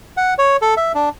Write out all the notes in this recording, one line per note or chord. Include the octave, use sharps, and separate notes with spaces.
F#5
C#5
A4
E5
D4